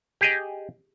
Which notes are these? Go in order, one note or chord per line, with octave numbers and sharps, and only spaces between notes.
G4 G#4 D#5